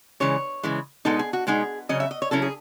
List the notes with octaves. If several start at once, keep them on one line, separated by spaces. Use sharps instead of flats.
C#3 E3 G#3 C#5
C#3 E3 G#3
B2 G#3 B3 D#4 A4
G#4
F#4
B2 G#3 B3 D#4 G#4
C#3 F#3 C#4 D#5
E5
D#5
C#5
C#3 F#3 C#4 E4 A4
G#4